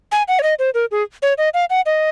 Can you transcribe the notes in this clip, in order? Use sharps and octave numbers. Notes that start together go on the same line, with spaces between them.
G#5
F#5
C#5
D#5
C5
A#4
G#4
C#5
D#5
F5
F#5
D#5